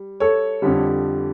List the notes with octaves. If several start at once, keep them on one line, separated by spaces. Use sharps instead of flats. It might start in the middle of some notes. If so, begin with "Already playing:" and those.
Already playing: G3
A4 C#5
F2 D3 G3